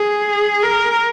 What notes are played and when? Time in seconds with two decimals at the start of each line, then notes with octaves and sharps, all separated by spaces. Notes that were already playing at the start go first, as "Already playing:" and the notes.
Already playing: G#4
0.63 A#4